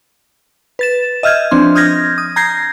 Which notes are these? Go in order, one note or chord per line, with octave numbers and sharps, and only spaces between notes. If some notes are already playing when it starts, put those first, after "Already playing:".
B4 A6 E7
D#5 E5 F6 G6 G#6
F3 C4 D4 C6
D#6 F6 G6 G#6 A#6
D#6
A#5 G6 G#6 A#6 C7